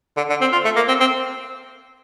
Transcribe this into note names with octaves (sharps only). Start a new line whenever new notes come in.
D3
D3
C4
F4
A3
A#3
C4
C4